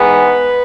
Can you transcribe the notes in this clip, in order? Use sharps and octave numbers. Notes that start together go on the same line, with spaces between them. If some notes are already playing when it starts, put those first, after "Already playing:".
Already playing: G#2 E3 G#3 B3 B4